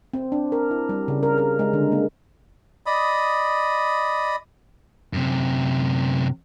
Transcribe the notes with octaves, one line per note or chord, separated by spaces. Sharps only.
C4
D4
A#4
E4
G3
C#3
A#4
A#4
G#3
D3
A#3
D5 D#5 B5 D#6
F#2 C3